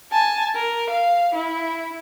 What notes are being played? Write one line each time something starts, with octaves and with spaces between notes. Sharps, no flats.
G#5 A5
A#4
F5
E4